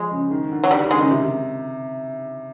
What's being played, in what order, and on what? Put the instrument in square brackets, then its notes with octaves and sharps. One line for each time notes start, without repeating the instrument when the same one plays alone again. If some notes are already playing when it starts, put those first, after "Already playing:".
Already playing: [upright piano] F3 [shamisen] G#3
[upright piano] C#3
D#3
D3
[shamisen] F#3
[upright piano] D3 [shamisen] G3
[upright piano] D#3
[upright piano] D3 [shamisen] G#3
[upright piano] C#3
C3